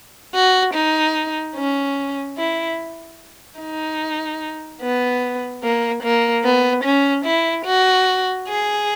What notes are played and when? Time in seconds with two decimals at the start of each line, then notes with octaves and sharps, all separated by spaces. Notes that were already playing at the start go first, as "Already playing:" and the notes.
0.34 F#4
0.75 D#4
1.56 C#4
2.37 E4
3.60 D#4
4.81 B3
5.63 A#3
6.03 A#3
6.44 B3
6.84 C#4
7.25 E4
7.65 F#4
8.48 G#4